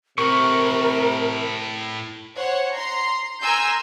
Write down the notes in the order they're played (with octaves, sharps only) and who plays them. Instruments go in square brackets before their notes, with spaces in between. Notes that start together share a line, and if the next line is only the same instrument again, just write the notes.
[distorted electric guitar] A2 B4 [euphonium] C3 [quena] A#4 [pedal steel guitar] C#6
[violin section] C5 C#5 F#5
A#5 C6
A#4 G#5 A#5 C6 E6 G6